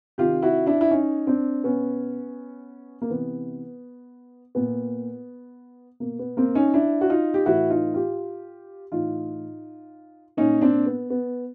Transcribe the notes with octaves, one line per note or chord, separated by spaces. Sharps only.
C3 D#3 F4 G4
E4 F#4
D4 E4
E4
C#4 D#4
C4 D4
B2 B3 C#4
A#3
C3 E3 B3
A#2 B3
B2 A#3
B3
A#3 C4
C#4 D#4
D4 E4
F#4
D#4 F4
G4
A2 E3 E4 F#4
D#4 F4
F4 G4
A2 E3 D#4 F4
A#2 C#4 D#4
C4 D4
B3
B3